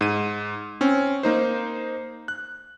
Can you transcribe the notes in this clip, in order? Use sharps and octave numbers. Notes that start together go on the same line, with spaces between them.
G#2 D#7
C4 C#4
A#3 D#4 C5
F#6